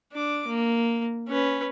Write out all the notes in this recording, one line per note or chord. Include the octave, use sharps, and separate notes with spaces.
D4 D6
A#3
C#4 B4